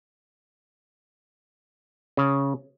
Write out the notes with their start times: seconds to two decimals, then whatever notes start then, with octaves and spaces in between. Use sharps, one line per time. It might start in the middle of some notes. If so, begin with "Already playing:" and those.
2.17 C#3